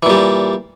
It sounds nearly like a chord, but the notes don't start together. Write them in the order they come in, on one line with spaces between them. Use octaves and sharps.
E3 A#2 G3